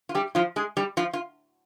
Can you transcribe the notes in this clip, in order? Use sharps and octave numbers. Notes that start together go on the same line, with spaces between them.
F4
G3 G4
F3 F4
G#3 G#4
G3 G4
F3 F4
F4